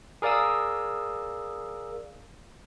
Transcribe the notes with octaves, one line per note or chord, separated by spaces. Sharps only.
G#4 A#4 D5 F5 D#6 E6